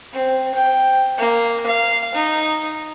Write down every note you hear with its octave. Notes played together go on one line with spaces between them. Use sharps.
C4
G5
A#3
F5
D#4